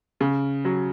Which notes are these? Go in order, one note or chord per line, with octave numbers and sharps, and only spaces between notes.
C#3
F#3